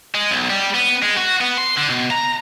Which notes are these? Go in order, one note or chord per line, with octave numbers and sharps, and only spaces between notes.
G#3
B1
G3
B3
G#3
F#4
B3
C6
D3
B2
A#5